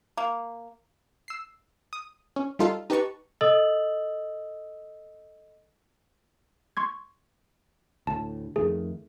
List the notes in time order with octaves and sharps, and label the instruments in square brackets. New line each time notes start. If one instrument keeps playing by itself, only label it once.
[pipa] A#3
[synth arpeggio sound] E6 C7
D#6
C#4
G3 D#4 F4 A4 F5
D#4 G4 B4 A5 C#6
[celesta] A4 D#5 D#6 E6 A6 F#7
[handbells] C6 C#6 G#6
[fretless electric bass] D2 A2 [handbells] A5
[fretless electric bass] F2 D#3 A3 [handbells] G#4